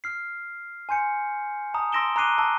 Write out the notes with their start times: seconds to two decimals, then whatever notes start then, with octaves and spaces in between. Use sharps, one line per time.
0.04 F6 C7
0.89 G#5 C6 G6 C#7
1.74 A5 A#5 D#6
1.92 C6 E6 A#6 D7 E7 G7
2.16 A#5 D6 F#6 C7 D#7 G7
2.38 A5 E6